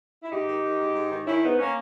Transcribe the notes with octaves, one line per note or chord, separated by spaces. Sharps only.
E4
G#2 D#4 G4
D#3
D#3
G#2
G#2
D#3
D#3 C#4 E4
G#2 B3 D#4
A#3 C#4